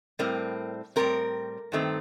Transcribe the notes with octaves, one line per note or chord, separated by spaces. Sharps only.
A2 G3 C4 A#4
A2 G3 C4 A#4
G2 D#3 A3 C4